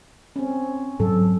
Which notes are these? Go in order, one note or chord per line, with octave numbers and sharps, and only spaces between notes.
C4 C#4
G#2 F#3 A4